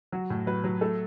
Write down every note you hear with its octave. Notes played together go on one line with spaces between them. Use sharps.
F#3 F#4
A2
F#3 B4
F#3
A3 A4